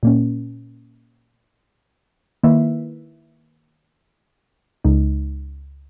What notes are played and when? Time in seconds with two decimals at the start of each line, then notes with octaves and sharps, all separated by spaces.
0.03 A#2 A#3 C#4
2.44 D#3 A#3 E4 B4 E5
4.85 C#2 C#3 G#3 D#4